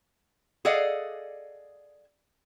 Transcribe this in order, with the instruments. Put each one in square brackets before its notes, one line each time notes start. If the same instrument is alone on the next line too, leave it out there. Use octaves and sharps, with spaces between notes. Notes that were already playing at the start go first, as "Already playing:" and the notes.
[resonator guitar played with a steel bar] G#4 A4 D5 D#5 F5 F#5